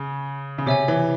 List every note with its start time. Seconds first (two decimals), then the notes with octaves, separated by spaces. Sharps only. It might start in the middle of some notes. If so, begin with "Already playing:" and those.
Already playing: C#3
0.58 C#3
0.66 C3 C#5 E5 G#5
0.88 E3